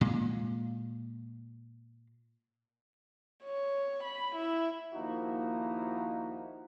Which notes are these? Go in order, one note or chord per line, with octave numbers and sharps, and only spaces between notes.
A#2 G#3
C#5
B5
E4
D#2 F3 A#3 D#4 E4 F#4